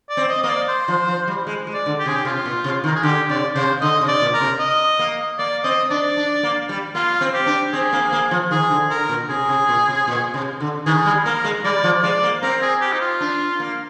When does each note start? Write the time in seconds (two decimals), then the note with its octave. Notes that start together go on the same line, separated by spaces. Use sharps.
0.10 D5
0.17 C4
0.29 D#5
0.43 A#3 D#5
0.49 D5
0.69 C5
0.88 F3
1.08 F3
1.27 G3
1.47 G#3
1.67 G#3
1.74 D5
1.86 D3
2.00 G4
2.06 C3 G#4
2.16 G4
2.25 C3 F4
2.46 A#2
2.64 C3
2.84 D#3
2.88 A#4
2.96 G#4
3.03 D3 G4
3.29 C3 D5
3.55 C3 C5
3.82 D3 D#5
4.01 C3
4.08 D5
4.22 A#2
4.34 A#4
4.41 C3
4.60 D#5
4.99 A#3
5.39 A#3 D5
5.64 C4 D#5
5.90 D4 D5
6.17 D4
6.43 A#3
6.69 G3
6.95 A#3 F4
7.21 C4
7.34 G4
7.46 D4
7.73 C4 G#4
7.93 A#3
8.13 A#3
8.31 F3
8.51 D#3 G#4
8.71 D3
8.90 D3 A#4
9.09 A#2
9.29 C3 G#4
9.49 C3
9.69 A#2
9.88 C3
10.08 A#2
10.34 C3
10.60 D3
10.86 D#3 G#4
11.06 G3
11.25 A#3 A#4
11.45 G#3
11.64 G3 D5
11.84 F3
12.03 G#3 D5
12.23 A#3
12.43 C4 A#4
12.62 G#4
12.81 G4
12.93 D#4
13.00 F4
13.21 D4
13.60 A#3